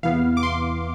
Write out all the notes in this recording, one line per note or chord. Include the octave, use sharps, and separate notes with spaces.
E2 C3 E3 B3 E4 F5
D6
C6